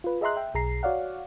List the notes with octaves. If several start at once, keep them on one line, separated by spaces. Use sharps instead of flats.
F4 B4
G#4 D#5 E5 A#5 C6 F#6
E5 G5
B1 G#4 A#5 C7
F#4 C#5 D5 F5 F#5